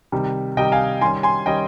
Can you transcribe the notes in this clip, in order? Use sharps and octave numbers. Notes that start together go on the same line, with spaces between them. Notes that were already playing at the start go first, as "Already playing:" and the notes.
C3 D#3 G3
C3 D#3 G3 D#5 G5
F5 G#5
D#3 G3 C#4 G#5 C6
G#5 C6
D#3 G3 C#4 D#5 G5